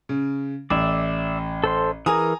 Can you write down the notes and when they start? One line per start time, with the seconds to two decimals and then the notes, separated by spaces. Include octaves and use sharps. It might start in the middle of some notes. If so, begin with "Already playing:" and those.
0.09 C#3
0.70 A1 D5 E5
1.64 A4 C5 C6
2.06 E3 G#4 A#4 G#5 A#5 D#6